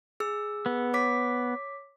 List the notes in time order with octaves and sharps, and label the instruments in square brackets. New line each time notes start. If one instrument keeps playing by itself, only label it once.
[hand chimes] G#4 E6
[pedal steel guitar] B3
[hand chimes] C#5 D6 B6